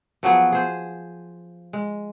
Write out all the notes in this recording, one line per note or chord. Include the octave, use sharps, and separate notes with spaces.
F3 F#3 B3 G#4
G#4 C5
G#3